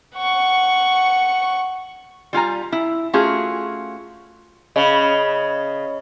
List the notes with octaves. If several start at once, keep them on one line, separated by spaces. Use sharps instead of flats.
F#5 C#6
G3 F4 G#5 A#5
E4
A3 C#4 F4 F#4 G#4
C#3 D#5 B5